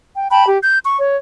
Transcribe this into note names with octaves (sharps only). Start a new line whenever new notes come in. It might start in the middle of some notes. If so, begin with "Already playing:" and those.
G5
G5 A5 B5
G4
G6
C#6
C#5